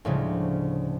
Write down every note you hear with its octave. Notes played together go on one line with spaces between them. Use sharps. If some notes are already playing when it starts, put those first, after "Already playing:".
D2 A2 C#3 F3 G3 G#3